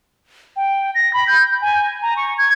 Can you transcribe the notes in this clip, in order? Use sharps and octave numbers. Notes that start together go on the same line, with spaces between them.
G5
A#6
B5
G6
G#5
A#5
C#6
G#6